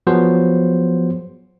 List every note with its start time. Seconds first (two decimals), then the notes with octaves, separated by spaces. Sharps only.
0.07 F3 F#3 B3 G#4 C5